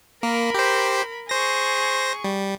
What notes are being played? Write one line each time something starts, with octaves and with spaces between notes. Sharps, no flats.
A#3 A#4 B5
G4 C5
G#4 C5 C#6 A#6
G3